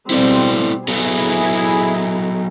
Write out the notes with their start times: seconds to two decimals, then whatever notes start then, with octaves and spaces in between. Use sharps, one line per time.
0.10 B2 G3 C4 E4 A4 D5
0.88 F#3 B3 E4 G#4 A4